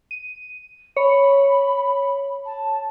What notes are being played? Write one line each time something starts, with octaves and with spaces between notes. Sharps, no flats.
D#7
C#5 B5
A5